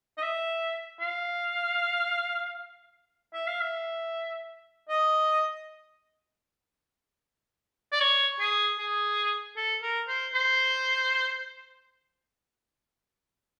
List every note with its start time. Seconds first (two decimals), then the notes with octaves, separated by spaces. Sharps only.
0.17 D#5
0.22 E5
1.00 F5
3.34 E5
3.47 F5
3.61 E5
4.89 D#5
7.92 D5
8.00 C#5
8.40 G#4
8.78 G#4
9.56 A4
9.82 A#4
10.08 C5
10.34 C5